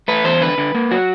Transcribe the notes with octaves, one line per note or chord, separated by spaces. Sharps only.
A3 B4
E2 C5
D3 B4
D3
A#3
F#3 F#4